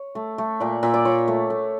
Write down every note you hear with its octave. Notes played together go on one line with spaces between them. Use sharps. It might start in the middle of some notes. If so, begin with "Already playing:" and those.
Already playing: C#5
A3
A3
A#2 D5
A#2 E5
D5
A#2 C#5
A3
A3